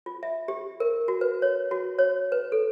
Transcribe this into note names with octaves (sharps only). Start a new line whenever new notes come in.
F4
E5
G4
A#4
F#4
B4
C#5
F#4
C#5
B4
A4